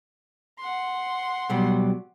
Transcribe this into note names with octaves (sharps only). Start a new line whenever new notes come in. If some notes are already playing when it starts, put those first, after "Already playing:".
F#5 C6
B2 F#3 G3